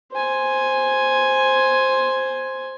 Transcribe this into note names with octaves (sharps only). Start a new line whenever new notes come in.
C5 G#5